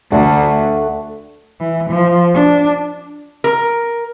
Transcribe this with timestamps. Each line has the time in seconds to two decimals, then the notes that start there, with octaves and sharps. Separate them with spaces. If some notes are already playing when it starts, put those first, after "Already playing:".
0.12 D2 A3 D4 F#5
1.60 E3
1.90 F3
2.34 D4
3.44 A#4